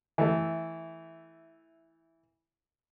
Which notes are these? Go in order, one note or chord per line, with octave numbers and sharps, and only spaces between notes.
E3 A3